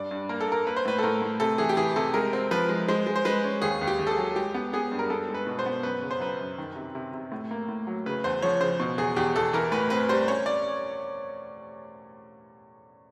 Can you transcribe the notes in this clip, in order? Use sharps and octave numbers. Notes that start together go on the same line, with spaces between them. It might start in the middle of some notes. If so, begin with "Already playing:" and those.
Already playing: G2 D5
G2
A#3 A#4
A4
A#3 A#4
A#3 B4
C5
A2 B4
A4
A2 A#4
A2
C3 A4
E3 G#4
G4
E3 G#4
C3 A4
G#3 A#4
C4
F3 B4
G#3
G#3 C5
G#3
C5
G#3 B4
C#4
D#2 G#4
D#2
G4
D#2
A4
G#4
F#3
G#3 G4
B3
B3 G#4
G2
A#4
B3 A4
G#3
B4
B2
C5
B3
F#2 B4
C#3
C5
F#2 B4
F#2
D#3
C3
C3
C3
A2
A#3
A2
F#3
C#3 B4
E2 C5
F3 C#5
C#3 C5
B2
E2 G#4
E2 G4
E2 A4
E3 A#4
A2 B4
C4 B4
G3 C5
C#4 C#5
D5